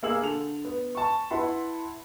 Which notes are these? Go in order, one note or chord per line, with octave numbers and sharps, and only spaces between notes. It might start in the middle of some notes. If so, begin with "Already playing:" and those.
A#3 G#4 F5 G#5 E6 F#7
D3 A4 F7
B3
A5 C#6
E4 B4 F#5 A5 B5 C6